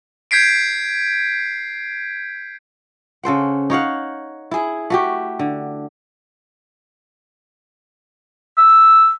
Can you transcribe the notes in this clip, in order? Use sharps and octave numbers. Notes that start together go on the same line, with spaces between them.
G6 G#6 B6 C7 D7
C#3 A4 C5 F#5
D#4 C#5 F5 F#5
E4 G#4
A3 F#4 G4
D3
E6